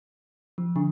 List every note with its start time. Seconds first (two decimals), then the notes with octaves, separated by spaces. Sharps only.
0.58 F3
0.76 D3